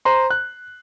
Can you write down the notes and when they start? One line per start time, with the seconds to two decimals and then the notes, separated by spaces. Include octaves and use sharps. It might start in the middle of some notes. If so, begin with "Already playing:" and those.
0.05 C5 A#5 C6
0.31 F#6